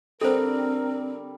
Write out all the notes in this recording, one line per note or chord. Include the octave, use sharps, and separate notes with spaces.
D3 G3 C4 A4 A#4 C5